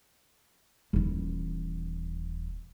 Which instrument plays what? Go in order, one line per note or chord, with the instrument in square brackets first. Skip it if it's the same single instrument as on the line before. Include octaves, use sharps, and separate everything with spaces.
[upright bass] D#1 E3